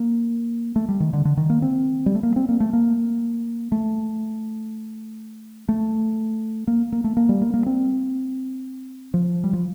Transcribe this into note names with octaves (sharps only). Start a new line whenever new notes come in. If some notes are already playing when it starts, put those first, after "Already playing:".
Already playing: A#3
A3
G3
D#3
D3
D3
D#3
A#3
C4
G3
A3
A#3
C4
A#3
A3
A#3
A3
A3
A#3
A#3
A3
A#3
G3
A#3
A#3
C4
F3
G3
F3